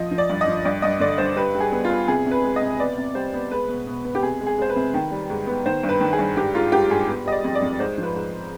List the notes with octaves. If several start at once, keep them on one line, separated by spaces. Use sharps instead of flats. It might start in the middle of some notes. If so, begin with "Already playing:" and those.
Already playing: F3 D#5
F3
D5
G2
D#5
F3
G2 D5
G2 D#5
D3 D5
G2 C5
G3 B4
G3
G#4
B3
F4
B3
C3 G#4
C3
B4
G#3
D#5
C3
B3 D5
C3
G3 C5
B3
G#3 B4
B2
B2
B3
G4
C3 G#4
G#3
G#4
G#3 C5
B4
C3
D#3
G3
G#2
B3
D#3 C5
G2
B4
D#3
G#4
G2
G#2 G4
G#2 F4
G#2 G4
G#2 G#4
B3
G3 D#5
D5
F2
D5
F2
G#2 C5
F3
B4
G#2